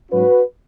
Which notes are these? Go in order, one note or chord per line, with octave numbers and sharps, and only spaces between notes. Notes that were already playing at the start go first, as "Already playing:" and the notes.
G#2 F#3 C#4 F#4 B4